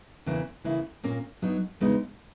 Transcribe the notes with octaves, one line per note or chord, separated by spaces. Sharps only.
E2 C#3 E3 A#3 E4
C#3 E3 A#3 E4
A#2 A#3 C#4
F#3 B3 D#4
E2 C#3 G#3 B3 D#4